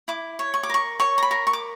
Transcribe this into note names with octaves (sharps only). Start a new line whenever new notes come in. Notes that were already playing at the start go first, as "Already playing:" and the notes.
E4 D6
C#5
C#6
D6
A#4 C#6
C#5 C#6
A#5
B5
A#4
C#6
D6